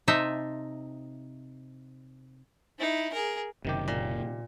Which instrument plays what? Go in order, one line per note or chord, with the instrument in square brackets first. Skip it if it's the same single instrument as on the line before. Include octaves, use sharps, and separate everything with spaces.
[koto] C3 C4 D#4 D#5 E5 A5
[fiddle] D#4 E4
G#4 A#4
[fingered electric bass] F#1 F#2 [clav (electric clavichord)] C3 D#3 G4
[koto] A#2